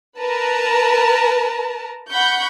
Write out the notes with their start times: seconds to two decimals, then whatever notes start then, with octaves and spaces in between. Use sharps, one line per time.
0.19 A#4 B4 A5 A#5
2.11 F#5 B5 C#6 G6